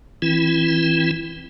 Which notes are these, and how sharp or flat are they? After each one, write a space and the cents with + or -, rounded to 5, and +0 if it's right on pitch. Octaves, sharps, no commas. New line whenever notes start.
E3 -15 C4 +10 E4 +15